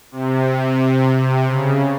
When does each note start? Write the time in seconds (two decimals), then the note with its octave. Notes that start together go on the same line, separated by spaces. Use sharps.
0.12 C3
1.14 C3
1.46 C#3